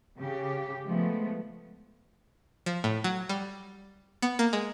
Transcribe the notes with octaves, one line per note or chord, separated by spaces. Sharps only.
C#3 G4
F3 G#3 A3 B3
F3
A2
F#3
G3
B3
A#3
G#3